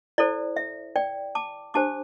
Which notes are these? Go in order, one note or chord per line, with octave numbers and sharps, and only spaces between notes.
E4 A4 C5 D5
E5
D5 G5
A5 D6
D4 G4 C5 A5 D6